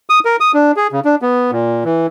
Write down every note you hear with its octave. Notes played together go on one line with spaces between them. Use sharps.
D#6
A#4
D#6
D4
G#4
C#3
D4
B3
A#2
E3